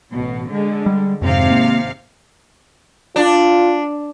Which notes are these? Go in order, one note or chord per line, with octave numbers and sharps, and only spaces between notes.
A1 B2
D3 G#3
G3
G#1 F2 C3 F5
A#3
D4 F4